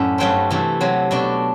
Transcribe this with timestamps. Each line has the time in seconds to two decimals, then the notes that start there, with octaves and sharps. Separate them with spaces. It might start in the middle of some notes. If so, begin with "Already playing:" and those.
Already playing: F#2 A2 D4 E5
0.18 G2 F#3 A3 C4 G5 B5
0.50 C3 E3 A3 C4
0.81 C3 F#3 C4
1.11 B2 A3 D4